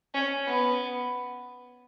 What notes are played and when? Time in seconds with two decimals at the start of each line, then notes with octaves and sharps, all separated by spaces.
0.14 C#4
0.46 B3